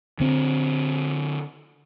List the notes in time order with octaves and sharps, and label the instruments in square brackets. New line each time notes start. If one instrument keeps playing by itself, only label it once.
[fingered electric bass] D3 C4